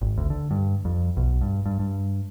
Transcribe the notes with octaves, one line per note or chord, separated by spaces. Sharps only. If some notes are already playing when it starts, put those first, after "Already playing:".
G#1
D2
D3
G2
F2
B1
G2
G2
G2